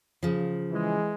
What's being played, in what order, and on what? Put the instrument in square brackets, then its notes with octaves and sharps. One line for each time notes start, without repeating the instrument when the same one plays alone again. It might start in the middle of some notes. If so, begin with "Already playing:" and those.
[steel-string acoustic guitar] C#3 F3
[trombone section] E3 G#3